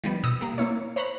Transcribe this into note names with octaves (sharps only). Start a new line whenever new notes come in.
D#3 F3 G3 B3
B2 D#6 E6 A#6 C#7
G3 A#3
A#3 E4 C#5
C5 C#5 A#5 B5 F#6